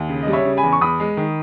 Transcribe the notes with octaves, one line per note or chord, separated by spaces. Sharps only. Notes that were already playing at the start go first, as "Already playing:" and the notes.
Already playing: D#2
C#3
G3 D#5
C#5 E5
C#3
G#5 B5
E2
C#6
E2 B5 D#6
G#3
D#3